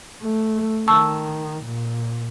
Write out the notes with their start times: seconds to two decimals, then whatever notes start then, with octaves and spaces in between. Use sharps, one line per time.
0.21 A3
0.88 D#3 A5 C#6 E6
1.64 A#2